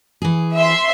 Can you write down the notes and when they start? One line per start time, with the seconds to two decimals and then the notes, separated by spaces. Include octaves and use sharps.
0.22 E3 G#4
0.55 E5 C6